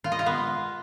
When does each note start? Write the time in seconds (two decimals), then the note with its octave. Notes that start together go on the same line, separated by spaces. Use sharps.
0.04 F4
0.12 D#5
0.19 F4
0.26 B3